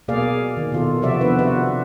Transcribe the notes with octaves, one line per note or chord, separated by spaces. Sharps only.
B2 A#3 G#4 D5 F5
D#3
B2 F4 A4
C3 F3 F#4 D5 E5
B3 D4 B4
B3 F4 F#4 B4 E5